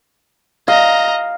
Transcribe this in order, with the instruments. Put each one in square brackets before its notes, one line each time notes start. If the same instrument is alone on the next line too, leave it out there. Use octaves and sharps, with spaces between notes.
[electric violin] D#5 A#5 [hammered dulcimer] F5